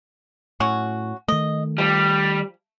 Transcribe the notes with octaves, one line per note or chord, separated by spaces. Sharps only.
A2 F#3 C#4 F#4
D#3 A3 D#5
F3 G3